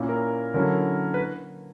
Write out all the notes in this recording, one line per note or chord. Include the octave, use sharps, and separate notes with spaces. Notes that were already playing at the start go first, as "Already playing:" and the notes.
Already playing: A#2 A#3 C#4 E4
A#4
D3 F#3 C#4 E4 A#4
B4